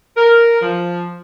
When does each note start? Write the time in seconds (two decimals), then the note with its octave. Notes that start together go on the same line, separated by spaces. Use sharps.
0.17 A#4
0.62 F3